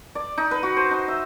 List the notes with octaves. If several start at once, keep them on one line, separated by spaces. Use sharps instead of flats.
D5
D#4
B4
F#4
C5
D#4
E5